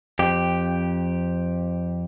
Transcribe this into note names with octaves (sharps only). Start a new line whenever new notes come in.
F2 G4